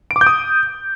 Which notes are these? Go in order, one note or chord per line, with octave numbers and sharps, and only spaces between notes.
D7
D6
G6
D#6